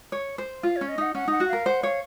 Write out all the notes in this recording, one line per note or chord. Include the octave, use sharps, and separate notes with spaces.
C#5
C5
F4 F5
C#4 C#5
D#5
D#4 F#5
C#4 F#5
D#4 F#5
F#4
A#4 F5
C5 F#5
C#5 F5